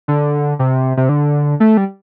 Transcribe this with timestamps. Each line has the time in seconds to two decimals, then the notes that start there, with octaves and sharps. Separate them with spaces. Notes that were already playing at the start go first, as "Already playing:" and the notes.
0.08 D3
0.59 C3
0.97 C3
1.09 D3
1.60 A3
1.77 G3